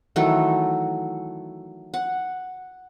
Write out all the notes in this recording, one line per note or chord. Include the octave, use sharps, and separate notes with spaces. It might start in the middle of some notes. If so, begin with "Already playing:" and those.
D#3 E3 F#3 A3
F#5